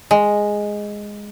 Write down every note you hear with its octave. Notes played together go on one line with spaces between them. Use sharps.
G#3